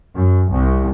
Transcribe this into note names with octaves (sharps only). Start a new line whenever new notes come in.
F#2
C2